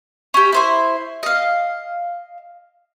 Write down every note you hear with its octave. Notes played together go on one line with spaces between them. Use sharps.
C#4 G4
E4 C5 C6
D#5 F5